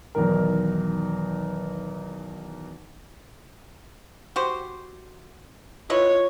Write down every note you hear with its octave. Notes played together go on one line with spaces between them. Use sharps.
B1 E2 D#3 A#4
F#4 G4 C5
E4 F4 B4 C#5 D#5